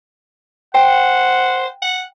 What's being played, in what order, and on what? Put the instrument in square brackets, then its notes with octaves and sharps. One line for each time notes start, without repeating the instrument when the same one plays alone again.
[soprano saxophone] C5 [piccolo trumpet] F#5 [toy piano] G5
[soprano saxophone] F#5